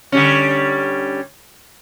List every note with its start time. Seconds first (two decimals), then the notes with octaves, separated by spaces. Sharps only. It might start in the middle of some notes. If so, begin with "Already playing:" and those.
0.12 D3 G3 C#4